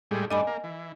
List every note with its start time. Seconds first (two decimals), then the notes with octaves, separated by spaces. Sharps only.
0.11 A2 G3 G#3
0.31 G2 A3 D4 D#5 G#5 B5
0.47 A#3
0.64 E3